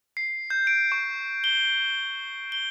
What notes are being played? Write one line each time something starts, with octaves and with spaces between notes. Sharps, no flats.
C7
G6
D7
C#6
G7
G7